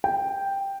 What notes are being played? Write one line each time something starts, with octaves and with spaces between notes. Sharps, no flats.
G5